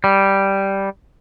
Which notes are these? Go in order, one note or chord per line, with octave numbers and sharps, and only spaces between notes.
G3